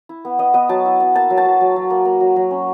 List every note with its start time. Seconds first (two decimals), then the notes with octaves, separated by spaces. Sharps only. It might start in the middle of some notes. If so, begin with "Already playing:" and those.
0.09 E4
0.25 B3
0.39 B3 D#5
0.54 B3 D#5
0.69 F#3 A5
0.85 E4
1.00 B3
1.15 A#3 A5
1.30 F#3
1.38 A5
1.45 F#3
1.61 F#3
1.76 F#3
1.90 A#3
2.05 A#3
2.20 F#3
2.36 F#3
2.51 C#4